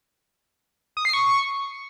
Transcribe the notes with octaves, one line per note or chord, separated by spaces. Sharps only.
D#6
C7
C#6